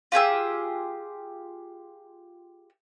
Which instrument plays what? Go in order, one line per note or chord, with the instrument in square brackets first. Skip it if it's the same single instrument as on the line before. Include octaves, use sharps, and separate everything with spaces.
[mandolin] F4 G4 G#4 E6